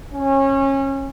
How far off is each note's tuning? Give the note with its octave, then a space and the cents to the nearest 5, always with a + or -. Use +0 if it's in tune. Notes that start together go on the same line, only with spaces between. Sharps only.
C#4 -25